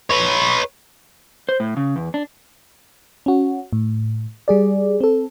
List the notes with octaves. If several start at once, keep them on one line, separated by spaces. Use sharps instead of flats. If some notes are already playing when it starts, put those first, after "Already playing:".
B4 C#5
C5
A2
C#3
E2
D4
C#4 F#4
A2
G3 G#4 D5
C4 A4